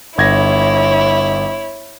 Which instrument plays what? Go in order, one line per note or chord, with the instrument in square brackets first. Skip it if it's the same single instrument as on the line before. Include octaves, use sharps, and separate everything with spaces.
[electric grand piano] G1 G#6 A#6 [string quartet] E4 C#5